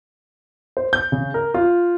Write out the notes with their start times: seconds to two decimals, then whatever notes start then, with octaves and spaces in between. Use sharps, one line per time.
0.77 C5
0.93 G6
1.12 C#3
1.34 A#4
1.54 F4